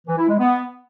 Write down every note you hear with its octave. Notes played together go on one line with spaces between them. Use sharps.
E3
E4
G#3
B3